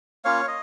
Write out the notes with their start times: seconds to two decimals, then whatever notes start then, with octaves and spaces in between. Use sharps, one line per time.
0.25 A#3 C#4 F4 C#5 F5
0.48 D#5